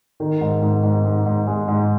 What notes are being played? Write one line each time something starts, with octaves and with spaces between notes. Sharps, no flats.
D#3
G#2
G#2
G#2
G#2
G#2
G#3
G#2